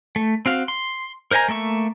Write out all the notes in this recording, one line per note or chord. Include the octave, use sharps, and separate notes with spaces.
A3
C4 F#4 F5
C6
A#4 C5 D#5 G#5 A#5
A3 A#3 E5 C#6